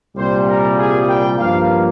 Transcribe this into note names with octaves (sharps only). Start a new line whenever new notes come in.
C2 A#2 G3 C5
A#4
G#4
G5
G2 F3 A#3 F5